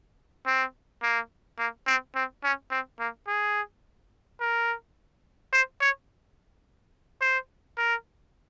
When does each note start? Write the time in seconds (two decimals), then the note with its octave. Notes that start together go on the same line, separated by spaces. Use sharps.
0.46 C4
1.02 A#3
1.59 A#3
1.87 C4
2.15 C4
2.44 C#4
2.71 C4
3.00 A#3
3.27 G#4
4.40 A#4
5.52 C5
5.81 C#5
7.21 C5
7.78 A#4